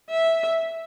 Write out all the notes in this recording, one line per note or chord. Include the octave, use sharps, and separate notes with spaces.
E5